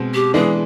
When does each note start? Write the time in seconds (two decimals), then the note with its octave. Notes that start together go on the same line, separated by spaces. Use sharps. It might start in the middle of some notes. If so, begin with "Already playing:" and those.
Already playing: B2 G#3 C4
0.14 G4
0.34 E3 G#3 B3 D4 G#4